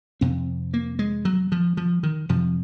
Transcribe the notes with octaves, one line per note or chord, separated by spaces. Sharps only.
F2 C3 C4
A#3
G#3
F#3
F3
F3
D#3
F2 C3 F3